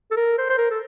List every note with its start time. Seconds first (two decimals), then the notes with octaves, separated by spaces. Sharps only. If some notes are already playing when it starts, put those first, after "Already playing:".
0.11 A4
0.16 A#4
0.38 C5
0.50 C5
0.58 A#4
0.71 A4